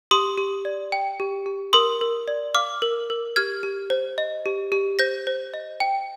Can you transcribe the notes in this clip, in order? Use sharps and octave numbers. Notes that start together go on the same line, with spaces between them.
G4 C6 D#6
G4
D5
G5
G4
G4
A#4 C6 D#6
A#4
D5
F5 D6 F6
A#4
A#4
G4 F6 G#6
G4
C5
D#5
G4
G4
C5 G6 A#6
C5
D#5
G5